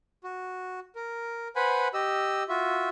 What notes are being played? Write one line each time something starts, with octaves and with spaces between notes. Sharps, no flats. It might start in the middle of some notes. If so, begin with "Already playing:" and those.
F#4
A#4
B4 C5 F#5 G#5 B5
G4 D#5 E6
F4 F#4 E5